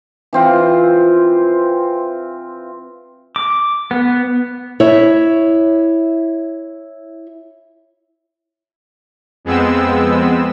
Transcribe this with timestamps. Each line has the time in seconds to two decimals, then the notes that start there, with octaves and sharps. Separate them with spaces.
0.33 E3 C4 F4
3.36 D6
3.91 B3
4.80 E4 C#5 E5
9.45 F2 G#3 B3 C4 E6